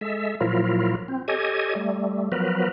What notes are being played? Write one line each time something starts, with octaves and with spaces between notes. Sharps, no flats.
G#3 A4 E5
A#2 F3 F#3 E4 F4 A#4
C4
G4 A4 C#5 D#5 G#5
G3 A3
F3 F#3 B3 A#4 B4